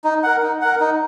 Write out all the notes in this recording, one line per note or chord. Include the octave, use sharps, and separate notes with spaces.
D#4
A#4 F#5
D#4
A#4 F#5
D#4